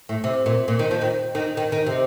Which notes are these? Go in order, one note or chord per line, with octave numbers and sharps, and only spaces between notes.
A2
C3
A#2
A#2
D#3
F3
D#3
D#3
D#3
D#3
C3